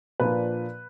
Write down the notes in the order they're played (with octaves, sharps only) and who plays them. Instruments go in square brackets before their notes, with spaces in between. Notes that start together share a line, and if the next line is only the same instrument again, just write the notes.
[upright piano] A#2 F3 A#3 D4 B4